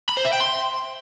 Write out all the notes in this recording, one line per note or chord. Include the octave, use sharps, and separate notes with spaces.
B5
C5
E5
G5
C6